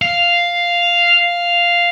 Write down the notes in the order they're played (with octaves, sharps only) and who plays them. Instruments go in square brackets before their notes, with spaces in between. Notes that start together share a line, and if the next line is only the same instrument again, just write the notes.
[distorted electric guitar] F5